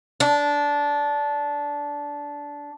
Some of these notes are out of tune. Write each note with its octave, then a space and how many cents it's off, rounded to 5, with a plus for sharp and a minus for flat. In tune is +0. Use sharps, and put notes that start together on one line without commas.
D4 -15